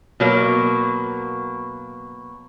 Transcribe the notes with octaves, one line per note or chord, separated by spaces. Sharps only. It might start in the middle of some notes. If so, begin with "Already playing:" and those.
B2 F#3 A#3